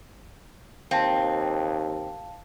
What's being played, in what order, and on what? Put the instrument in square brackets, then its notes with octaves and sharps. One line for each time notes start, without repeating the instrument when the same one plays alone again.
[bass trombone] D#2 [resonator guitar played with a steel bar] C4 [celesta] F5 G5 A5